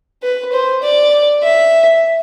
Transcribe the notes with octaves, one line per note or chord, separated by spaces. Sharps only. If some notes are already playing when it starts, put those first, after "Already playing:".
B4
C5
D5
E5